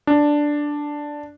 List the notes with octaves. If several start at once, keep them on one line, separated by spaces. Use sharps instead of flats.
D4